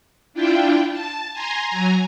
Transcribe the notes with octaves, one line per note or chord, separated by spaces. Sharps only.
D4 E4 F4 G5
A5
G#5 A#5 C6
F#3 G#5 A#5